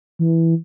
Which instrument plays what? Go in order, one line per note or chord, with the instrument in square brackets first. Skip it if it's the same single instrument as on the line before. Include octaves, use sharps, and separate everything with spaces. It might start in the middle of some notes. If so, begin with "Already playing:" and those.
[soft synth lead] E3